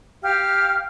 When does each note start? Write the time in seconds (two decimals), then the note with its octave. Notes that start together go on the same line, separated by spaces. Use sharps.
0.23 G4 F5 F6